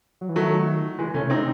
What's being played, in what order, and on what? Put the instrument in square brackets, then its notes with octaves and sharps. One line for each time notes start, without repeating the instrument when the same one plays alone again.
[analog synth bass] F#3
E3
[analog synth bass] D#3 [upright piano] F#3 A3
[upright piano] E3 G#3
[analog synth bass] C3 [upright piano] A3 C#4
[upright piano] C4 D#4